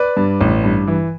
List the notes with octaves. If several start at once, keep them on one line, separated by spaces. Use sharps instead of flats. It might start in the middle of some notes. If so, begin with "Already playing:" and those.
Already playing: B4 D5
G2
A1
G2
E3